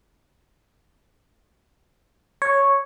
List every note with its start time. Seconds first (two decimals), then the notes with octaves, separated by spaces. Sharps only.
2.42 C#5